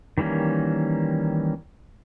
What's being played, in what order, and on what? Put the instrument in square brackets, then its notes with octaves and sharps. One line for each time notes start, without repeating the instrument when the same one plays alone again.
[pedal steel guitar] D#3 E3 G3 A#3 C#4